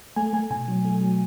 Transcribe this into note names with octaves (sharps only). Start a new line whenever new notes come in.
A3 G#5
A3 G#5
B2 G#5
F#3
A3
F#3